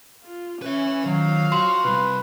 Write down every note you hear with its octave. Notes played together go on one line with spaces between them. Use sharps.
F4
C#4 B4 E5
D#3 F3 F#3 F5
F#4 C6
C3 G3 B4